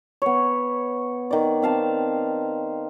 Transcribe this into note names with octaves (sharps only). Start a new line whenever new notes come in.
B3 C#5
D#3 D5
C4 F5 A5